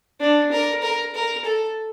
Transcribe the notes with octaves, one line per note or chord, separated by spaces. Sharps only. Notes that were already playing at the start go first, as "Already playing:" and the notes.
D4
A#4
A#4
A#4
A4